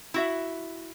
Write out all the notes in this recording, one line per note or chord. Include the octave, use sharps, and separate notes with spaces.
E4 F#4 E5